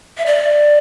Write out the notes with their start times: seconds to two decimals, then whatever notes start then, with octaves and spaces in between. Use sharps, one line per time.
0.18 E5
0.26 D5